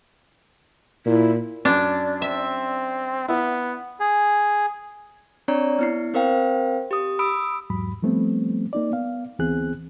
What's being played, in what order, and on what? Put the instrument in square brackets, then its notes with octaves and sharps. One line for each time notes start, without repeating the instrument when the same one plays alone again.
[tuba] A#2 [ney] E4
[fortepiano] F#2 [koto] D4
[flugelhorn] C4 [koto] E5
[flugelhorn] B3 [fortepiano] E4
[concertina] G#4
[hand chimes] C4 D4 C#5 D5 A#5
B3 E4 C7
C4 A#4 C5 F5 G5
G4 D#6
B5 D#6 E6 D7
[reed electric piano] E2 G#2 F#3 B5
F3 G3 A3 B3 C4
A#3 D#4 D5
B3 F5
D2 E3 B3 C4 G#4 F#6